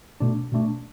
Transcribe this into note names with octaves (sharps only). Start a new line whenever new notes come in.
B2 A3 D4
B2 A3 D4